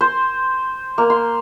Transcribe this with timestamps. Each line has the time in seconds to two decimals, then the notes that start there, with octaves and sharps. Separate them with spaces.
0.01 C5
0.98 A#3
1.10 C6